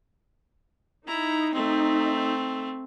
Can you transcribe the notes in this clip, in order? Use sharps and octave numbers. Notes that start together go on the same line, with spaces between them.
D#4 E4 A#5
A3 C4